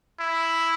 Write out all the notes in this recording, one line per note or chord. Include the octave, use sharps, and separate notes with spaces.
E4